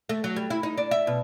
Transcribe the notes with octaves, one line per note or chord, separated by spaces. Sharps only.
A3
F#3
G3
E4
D#4
D4
E5
B2